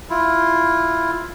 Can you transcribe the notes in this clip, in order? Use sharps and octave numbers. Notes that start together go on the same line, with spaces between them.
E4 F4